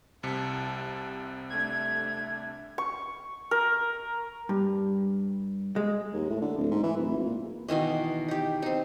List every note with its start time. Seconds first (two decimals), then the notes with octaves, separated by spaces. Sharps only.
0.23 C2 C3 A5 C#7
1.50 A3 D4 G#6
2.78 C#6
3.51 A#4
4.49 G2
5.76 G#3
6.13 D#2
6.30 A2
6.42 D3
6.58 D1
6.71 G#2
6.83 E3
6.97 D1
7.10 G#1
7.26 A#2
7.68 B2 D#3 E3 D#5
8.28 D#4 G4
8.62 C4 D#4